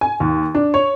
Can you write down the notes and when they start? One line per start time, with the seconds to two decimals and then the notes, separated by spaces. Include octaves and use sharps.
0.01 G#5
0.20 D#2
0.55 D4
0.74 C#5